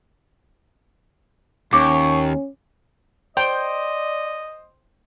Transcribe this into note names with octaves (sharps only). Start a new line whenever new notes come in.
D#2 C#4 C#6 D6
C5 D5 D#5 G5